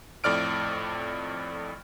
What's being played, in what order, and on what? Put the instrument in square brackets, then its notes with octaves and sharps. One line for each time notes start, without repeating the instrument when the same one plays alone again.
[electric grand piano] F2 A2 D5 F6 D7